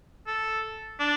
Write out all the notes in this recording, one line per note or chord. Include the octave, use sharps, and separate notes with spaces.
A4
D4